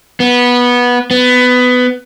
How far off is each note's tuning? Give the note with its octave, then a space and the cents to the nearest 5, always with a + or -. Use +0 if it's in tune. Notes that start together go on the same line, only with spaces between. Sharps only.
B3 -15
B3 +15